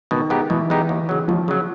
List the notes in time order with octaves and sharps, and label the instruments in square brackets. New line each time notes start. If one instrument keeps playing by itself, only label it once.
[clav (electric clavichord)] B2 [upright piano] D#3
[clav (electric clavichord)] G#3 B3 D#4 G4
[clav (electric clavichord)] B2 [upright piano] E3
[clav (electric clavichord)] G#3 B3 D#4 G4
D#2
C#3 F#3
[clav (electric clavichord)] D#2 [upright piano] F3
[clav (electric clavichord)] C#3 F#3